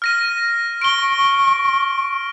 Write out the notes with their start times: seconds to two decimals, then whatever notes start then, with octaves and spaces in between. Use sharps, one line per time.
0.02 F6 A#6 D#7
0.82 C#6 D7 G7